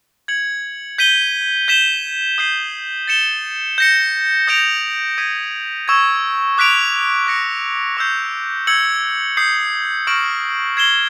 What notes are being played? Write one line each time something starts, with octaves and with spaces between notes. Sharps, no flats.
G#6 C#7 F#7
G6 B6 D#7 G7
G6 B6 E7 G7
D#6 G6 C7 D#7 F#7
A6 C#7 E7 G7
G6 A#6 C#7
D#6 G6 A#6 D7 F7
D#6 G#6 B6 D#7
C#6 E6 G#6
D6 F#6 B6 D7 F7
F#6 A#6 C#7
C#6 E6 G6 C7
E6 G#6 C#7 F#7
D#6 G6 C7
C#6 F6 A#6 D7 F#7
G#6 C7 E7 G7